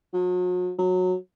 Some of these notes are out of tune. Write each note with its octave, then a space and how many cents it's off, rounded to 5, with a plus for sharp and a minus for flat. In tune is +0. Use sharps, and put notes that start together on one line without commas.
F#3 -40
F#3 -15